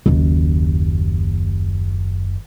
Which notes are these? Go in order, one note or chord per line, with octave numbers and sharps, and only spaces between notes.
F#1 D#2